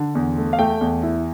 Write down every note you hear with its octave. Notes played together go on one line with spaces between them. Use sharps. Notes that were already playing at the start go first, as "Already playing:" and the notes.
Already playing: D3
E2
A3
F5
A3 G5
E2
E4